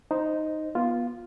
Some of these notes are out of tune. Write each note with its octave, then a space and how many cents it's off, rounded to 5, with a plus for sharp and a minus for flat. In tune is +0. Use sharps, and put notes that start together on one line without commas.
D#4 +0 C5 +0 D#5 +0
B3 -30 F4 +0